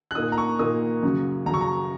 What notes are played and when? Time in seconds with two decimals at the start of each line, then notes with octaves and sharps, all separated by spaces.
0.11 F#6
0.15 A#2 A#3 D#4 D#6
0.32 A#5
0.38 C#6
0.59 A#2 A#3 D#4 D#6
1.03 F#2 C#3 F#3
1.46 F#2 C#3 F#3 A#5
1.54 C#6
1.61 A#5